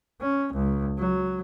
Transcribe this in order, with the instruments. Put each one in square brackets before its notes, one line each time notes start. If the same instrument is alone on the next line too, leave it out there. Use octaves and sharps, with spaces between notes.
[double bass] C#4
C#2
F#3